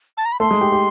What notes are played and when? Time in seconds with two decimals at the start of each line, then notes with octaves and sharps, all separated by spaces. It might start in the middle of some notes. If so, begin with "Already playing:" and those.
0.17 A5
0.25 A#5
0.32 B5
0.40 A3 A4 C6
0.51 G#3 G#4
0.61 G4
0.72 G4